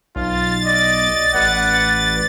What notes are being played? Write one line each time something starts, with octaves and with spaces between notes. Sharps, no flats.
B1 F4 A6
D5 D#5
A1 B4 D5 F#5